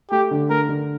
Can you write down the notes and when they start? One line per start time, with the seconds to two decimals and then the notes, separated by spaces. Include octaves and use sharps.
0.11 A3 G4
0.31 D3
0.50 A3 A#4
0.69 D3